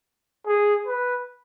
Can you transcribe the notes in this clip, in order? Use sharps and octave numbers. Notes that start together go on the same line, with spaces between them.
G#4
B4